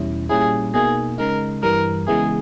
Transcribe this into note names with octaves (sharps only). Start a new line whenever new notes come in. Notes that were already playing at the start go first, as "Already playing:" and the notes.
Already playing: E2 B2 G3 C#4 E4
A#2 G3 C#4 E4 G#4
B2 A#3 D#4 G#4
C#3 G#3 D#4 A#4
G2 E3 G3 A#4
C#3 E3 G#3 B3 E4 G#4